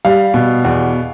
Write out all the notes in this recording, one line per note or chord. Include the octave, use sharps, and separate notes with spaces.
G3 F5
B2
E2